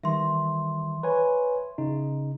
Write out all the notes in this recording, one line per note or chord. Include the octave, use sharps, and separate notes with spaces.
D#3 E3 G3 E5 C6
B4 C#5 G#5
C#3 D#4